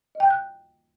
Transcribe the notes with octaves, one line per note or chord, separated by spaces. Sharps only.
D#5
G5
G6
F#6